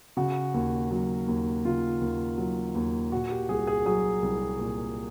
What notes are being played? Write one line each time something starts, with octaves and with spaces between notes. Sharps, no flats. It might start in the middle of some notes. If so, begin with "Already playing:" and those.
C#3 F#4
D#2
F#3
D#2
C#3 F4
D#2
F#3
D#2
A#2 F#4
G4
C2 G#4
G#4
F#3 G#4
C2
A#2